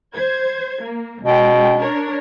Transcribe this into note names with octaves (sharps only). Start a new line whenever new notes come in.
C5 G#6
A#3
C#2 B2 G5
D4 A#4 C#5